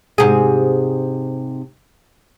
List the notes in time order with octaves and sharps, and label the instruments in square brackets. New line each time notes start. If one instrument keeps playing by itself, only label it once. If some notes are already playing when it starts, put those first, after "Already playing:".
[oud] G#2 C3 G#4